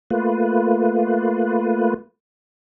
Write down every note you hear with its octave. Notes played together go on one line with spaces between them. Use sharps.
A3 A#3 F4 B4